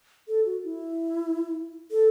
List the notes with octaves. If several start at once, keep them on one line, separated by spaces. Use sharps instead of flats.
A4
F#4
E4
A4